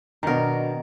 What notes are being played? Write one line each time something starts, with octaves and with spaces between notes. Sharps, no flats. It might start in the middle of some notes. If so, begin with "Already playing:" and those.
B2 D#3 D4 A#4 A#5